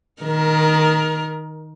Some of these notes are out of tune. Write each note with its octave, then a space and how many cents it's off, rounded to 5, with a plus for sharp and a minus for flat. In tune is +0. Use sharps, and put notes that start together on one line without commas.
D#3 +0 A#4 +20